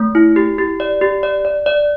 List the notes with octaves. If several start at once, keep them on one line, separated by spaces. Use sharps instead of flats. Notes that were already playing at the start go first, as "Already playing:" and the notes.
Already playing: A3
E4
G4
G4
D5
G4
D5
D5
D5